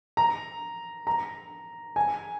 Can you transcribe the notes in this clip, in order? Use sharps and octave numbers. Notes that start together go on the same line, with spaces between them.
A#5
A#5
G#5